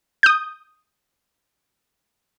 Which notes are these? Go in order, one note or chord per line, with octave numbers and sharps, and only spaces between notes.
D#6 G6